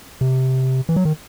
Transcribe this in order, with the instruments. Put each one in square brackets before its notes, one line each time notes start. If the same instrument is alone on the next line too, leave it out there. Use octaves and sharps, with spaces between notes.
[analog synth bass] C3
E3
F#3
D#3